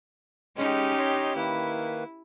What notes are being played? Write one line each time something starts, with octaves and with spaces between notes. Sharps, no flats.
G#3 C#4 D#4 G4
C#5 D#5 C6
D#3 A#3 E4 B4